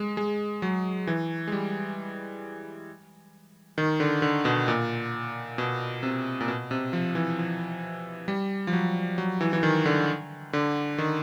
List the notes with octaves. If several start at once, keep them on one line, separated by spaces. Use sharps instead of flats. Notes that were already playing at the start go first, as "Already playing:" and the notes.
Already playing: G#3
G#3
F#3
E3
G#3
G3
D#3
D3
D3
B2
A#2
B2
C3
A#2
B2
C3
F3
E3
F3
G3
F3
F#3
F#3
E3
E3
D#3
D3
D3
D#3